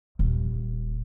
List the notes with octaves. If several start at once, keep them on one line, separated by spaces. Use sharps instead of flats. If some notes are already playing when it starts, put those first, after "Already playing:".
D#1